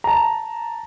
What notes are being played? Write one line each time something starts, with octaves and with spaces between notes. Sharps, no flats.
A5 A#5